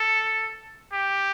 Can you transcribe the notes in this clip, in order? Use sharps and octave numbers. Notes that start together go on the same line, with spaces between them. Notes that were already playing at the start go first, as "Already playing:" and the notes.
Already playing: A4
G4